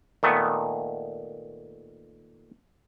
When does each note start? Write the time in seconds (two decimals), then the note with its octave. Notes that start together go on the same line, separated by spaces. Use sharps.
0.23 A#2 D#3 A3 B3